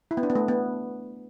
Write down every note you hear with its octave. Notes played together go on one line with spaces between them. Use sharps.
E4
B3
D4
B3
A3
B3